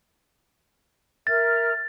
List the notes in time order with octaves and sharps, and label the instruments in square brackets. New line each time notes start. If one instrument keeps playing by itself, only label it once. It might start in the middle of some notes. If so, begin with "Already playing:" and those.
[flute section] A#4 E5 F6 [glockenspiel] A6